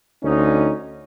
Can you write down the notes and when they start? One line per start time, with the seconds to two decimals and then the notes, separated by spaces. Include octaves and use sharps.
0.23 D2 C#4 D#4